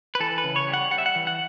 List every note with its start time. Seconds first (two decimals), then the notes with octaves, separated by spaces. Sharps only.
0.15 B4
0.20 E3 A4
0.38 B4
0.44 C#3
0.56 C#5
0.68 G3
0.73 F#5
0.91 G3 F#5
0.98 E5
1.06 F#5
1.15 E3
1.27 F#5